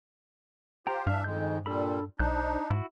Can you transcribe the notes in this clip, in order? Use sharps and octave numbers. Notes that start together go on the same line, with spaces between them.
F4 G4 C5 G5 A#5
G2 E3 D4 E5 F5
F2 D#3 G#3 G6
A#2 G3 D4 A4 B5
B1 D4 D#4 C5 F#6 G6
G#2 E4 F#4